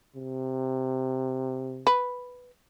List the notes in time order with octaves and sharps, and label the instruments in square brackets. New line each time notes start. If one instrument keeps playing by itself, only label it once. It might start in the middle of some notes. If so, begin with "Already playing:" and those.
[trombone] C3
[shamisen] B4